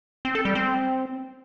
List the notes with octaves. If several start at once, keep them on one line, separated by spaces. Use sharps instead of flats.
C4
A4
G3
C4